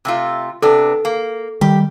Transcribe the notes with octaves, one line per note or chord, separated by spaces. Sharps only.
C3 A3 F4
C3 B3 D4 A4
A#3
D#3 G3 G4